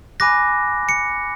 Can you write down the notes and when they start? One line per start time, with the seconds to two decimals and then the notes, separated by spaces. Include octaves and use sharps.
0.20 G#5 B5 D6 F#6 A#6
0.89 C#7